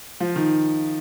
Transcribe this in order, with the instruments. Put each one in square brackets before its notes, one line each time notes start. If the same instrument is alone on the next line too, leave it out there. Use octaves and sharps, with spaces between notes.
[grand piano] F3
D#3